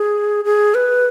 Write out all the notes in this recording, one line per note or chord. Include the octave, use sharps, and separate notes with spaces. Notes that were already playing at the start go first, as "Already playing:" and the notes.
Already playing: G#4
G#4
B4